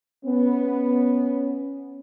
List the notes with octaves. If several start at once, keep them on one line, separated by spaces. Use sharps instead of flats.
B3 C#4